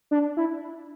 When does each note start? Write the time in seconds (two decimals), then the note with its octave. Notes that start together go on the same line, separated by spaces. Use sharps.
0.11 D4
0.37 E4